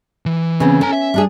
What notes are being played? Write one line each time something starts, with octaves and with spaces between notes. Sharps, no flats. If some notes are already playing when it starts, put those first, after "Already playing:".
E3
C#3 B3 C4
C#4 A4 A#5
E5
G3 D4 G#4